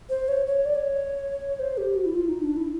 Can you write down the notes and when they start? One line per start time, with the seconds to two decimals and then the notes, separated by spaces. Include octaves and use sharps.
0.10 C5
0.28 C#5
0.47 C#5
0.65 D5
0.75 C#5
1.59 C5
1.78 G4
1.96 F#4
2.06 E4
2.15 F4
2.28 D#4
2.42 D4
2.57 E4